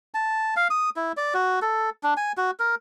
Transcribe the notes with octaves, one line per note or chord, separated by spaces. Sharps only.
A5
F5
D#6
E4
D5
F#4
A4
D4
G#5
F#4
A#4